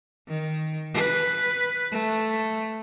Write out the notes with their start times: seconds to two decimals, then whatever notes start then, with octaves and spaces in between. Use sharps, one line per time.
0.28 D#3
0.94 B4
1.92 A3